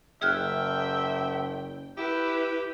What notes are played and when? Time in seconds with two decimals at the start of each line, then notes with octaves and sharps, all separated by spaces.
0.22 F#1 G#4 E5 G5 F6 F#6
1.97 E4 G4 B4